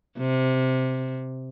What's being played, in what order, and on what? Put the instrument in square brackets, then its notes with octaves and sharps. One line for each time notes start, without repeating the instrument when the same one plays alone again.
[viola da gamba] C3